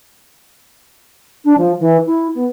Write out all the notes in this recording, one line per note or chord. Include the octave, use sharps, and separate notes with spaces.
D4
F3
E3
E4
B3